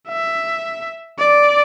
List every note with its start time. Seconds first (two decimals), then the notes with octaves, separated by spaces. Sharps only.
0.09 E5
1.19 D5